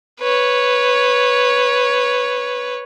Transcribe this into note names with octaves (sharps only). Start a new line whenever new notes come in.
B4 C#5